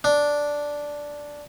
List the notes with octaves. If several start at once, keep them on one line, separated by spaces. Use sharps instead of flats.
D4